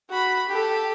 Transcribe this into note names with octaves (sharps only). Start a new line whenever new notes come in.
F#4 B5
G4 A4